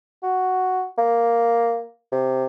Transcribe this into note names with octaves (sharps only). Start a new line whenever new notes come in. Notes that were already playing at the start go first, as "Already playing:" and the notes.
F#4
A#3
C3